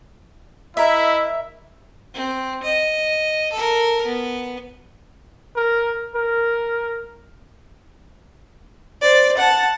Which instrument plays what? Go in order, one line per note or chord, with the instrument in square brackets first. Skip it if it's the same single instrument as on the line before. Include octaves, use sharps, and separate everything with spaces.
[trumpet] E4 [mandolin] A#4 E5 [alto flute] D#5
[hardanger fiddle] C4
D#5
A4 A#4
B3
[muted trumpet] A#4
A#4
[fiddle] C5 D5
F#5 A5